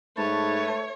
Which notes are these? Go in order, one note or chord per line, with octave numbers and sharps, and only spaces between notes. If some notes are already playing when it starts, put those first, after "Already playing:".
G#2 A3 B4 C#5 A5